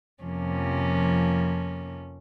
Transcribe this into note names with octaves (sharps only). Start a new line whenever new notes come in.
F2 C3 F3 A#3 C#4